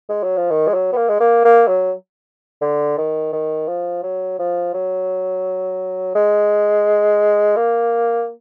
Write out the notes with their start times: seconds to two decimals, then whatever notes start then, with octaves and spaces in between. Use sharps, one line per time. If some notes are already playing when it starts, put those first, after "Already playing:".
0.09 G#3
0.23 F#3
0.37 F3
0.51 D#3
0.68 G#3
0.74 F#3
0.93 B3
0.97 A#3
1.09 G#3
1.20 A#3
1.45 A#3
1.68 F#3
2.62 D3
2.98 D#3
3.33 D#3
3.68 F3
4.03 F#3
4.39 F3
4.74 F#3
6.15 G#3
7.56 A#3